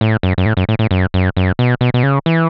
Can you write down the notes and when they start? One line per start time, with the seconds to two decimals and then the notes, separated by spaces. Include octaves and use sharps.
0.01 A2
0.23 F#2
0.38 F#2
0.46 A2
0.57 F#2
0.69 A2
0.79 A2
0.91 F#2
1.14 F#2
1.37 F#2
1.59 B2
1.81 B2
1.94 B2
2.03 C#3
2.26 E3